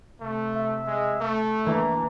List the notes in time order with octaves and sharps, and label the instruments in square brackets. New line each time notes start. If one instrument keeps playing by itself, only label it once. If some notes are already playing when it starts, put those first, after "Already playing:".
[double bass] C3 [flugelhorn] A3
[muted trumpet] E5
[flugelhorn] G#3
A3
[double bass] E3 [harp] A#3 [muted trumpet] D4